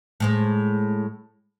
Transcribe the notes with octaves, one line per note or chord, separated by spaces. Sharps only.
A2 G#3 C5